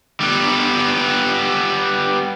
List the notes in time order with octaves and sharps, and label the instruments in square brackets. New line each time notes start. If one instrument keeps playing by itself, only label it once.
[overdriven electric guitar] G3 B3